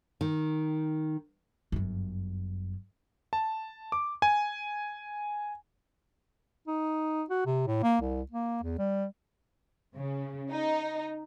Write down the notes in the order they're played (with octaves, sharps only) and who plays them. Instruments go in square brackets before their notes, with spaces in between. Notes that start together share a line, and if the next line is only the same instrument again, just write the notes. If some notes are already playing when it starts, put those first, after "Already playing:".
[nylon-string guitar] D#3
[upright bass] G1 F#2
[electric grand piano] A5
D6
G#5
[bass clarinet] D#4
F#4
C3
A2
A#3
C2
A#3
E2
G3
[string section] C#3
D#4